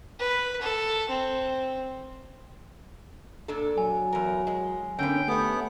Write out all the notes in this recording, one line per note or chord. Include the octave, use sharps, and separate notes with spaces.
B4
A4
C4
A#2 D4 A4
F#3 G#5
E2 A#4
G#3
D3 A#3 B3 C#4 G5
A3 B3 G4 C#5